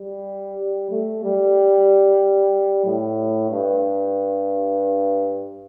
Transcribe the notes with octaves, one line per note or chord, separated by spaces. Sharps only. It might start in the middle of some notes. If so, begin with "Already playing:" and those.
Already playing: G3
A3
G3
A2
G2